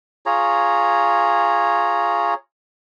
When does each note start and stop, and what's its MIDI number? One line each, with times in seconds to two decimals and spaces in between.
0.26 2.34 65
0.26 2.34 68
0.26 2.34 73
0.26 2.34 82